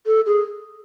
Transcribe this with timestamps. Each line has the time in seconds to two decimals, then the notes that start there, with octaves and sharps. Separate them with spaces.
0.06 A4
0.26 G#4